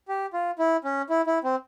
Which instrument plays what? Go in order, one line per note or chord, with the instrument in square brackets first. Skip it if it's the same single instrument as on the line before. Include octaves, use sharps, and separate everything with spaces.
[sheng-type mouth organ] G4
F4
E4
C#4
E4
E4
C4